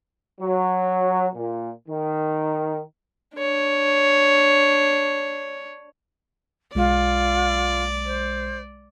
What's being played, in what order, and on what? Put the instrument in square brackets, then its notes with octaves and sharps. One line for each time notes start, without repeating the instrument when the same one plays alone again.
[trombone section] F#3
A#2
D#3
[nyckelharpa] D4 C#5
[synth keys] B1 G#3 [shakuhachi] F4 [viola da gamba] D5
[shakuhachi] C5